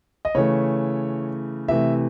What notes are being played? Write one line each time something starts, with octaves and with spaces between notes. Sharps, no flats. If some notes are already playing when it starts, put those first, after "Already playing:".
D#5
C#3 E3 A3 C#5
C3 E3 A3 E5